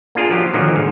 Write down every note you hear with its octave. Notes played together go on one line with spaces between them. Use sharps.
A#3 D4 F4 G#4 A#4
F3 F#3 F4 G4
A#2 D3 D#3 F3 F#3
G#2